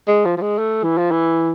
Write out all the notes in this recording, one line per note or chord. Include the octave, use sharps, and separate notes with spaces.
G#3
F3
F3
G#3
A3
E3
F3
E3